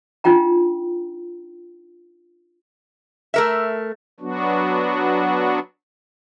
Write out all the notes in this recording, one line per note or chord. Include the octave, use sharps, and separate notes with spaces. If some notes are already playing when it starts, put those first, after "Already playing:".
D4 D#4 F4 G5 A#5
A3 A#4 E5
F#3 B3 D4 F#4